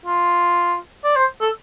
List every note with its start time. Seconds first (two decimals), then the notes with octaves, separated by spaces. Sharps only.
0.06 F4
1.04 D5
1.16 C5
1.41 A4